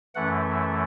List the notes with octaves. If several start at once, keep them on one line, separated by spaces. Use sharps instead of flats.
F#2 E3 A3 F#5